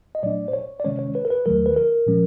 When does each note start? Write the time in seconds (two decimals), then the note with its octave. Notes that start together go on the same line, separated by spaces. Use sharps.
0.15 D#5
0.23 A#2 F#3 A3 D4 D5
0.48 C5
0.53 C#5
0.80 D5
0.84 C3 D#3 G#3 C#4 C#5
0.99 C#5
1.15 B4
1.25 A#4
1.30 B4
1.46 D#2 D#3 F#3 A3 A#4
1.66 B4
1.76 A#4
2.06 A#2 F3 G#3 C#4